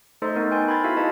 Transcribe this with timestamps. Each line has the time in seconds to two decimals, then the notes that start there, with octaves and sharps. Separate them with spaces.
0.22 A3 D#4 A4 C5 D#5 C6
0.36 B3 D#4 A#4
0.51 B4 G5 G#5 C6
0.68 B5 C6 F6 G#6 A6
0.84 E4 F#4 A4 E5 F5
0.97 D#4 E4 G#4 B4 D#5 A5